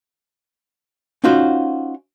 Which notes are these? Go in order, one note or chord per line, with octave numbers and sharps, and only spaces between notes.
C#4 D#4 F4 F#4 C5